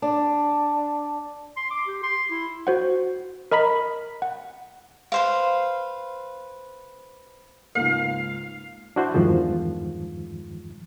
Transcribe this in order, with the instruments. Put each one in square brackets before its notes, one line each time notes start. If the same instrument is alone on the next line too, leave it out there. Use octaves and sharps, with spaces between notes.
[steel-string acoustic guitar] D4
[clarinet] C6
D6
G4
C6
E4
[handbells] F#4 C5 F#5
A#4 D#5 A#5 B5 B6
F#5
[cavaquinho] B4 C5 F5
[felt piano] C#2 G#2 A#3 [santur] F5
[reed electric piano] D4 E4 F#4 C5
E2 G2 D#3 F3 G#3